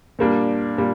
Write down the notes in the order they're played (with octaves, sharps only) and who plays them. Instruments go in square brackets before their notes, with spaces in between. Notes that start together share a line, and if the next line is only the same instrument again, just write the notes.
[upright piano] A#2 G3 A#3 D4
A#2 G3